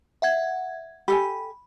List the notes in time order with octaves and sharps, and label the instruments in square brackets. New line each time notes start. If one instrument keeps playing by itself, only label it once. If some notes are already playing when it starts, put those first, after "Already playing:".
[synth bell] E5 F#5 G#6
[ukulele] G4 A4 G#5 [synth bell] B5